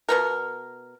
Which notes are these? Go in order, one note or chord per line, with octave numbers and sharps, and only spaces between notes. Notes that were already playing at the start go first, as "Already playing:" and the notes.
B2 B3 A#4